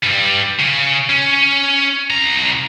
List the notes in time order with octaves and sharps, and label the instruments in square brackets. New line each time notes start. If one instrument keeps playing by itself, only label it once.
[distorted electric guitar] G2 G3
C#3
C#4
C2 A#5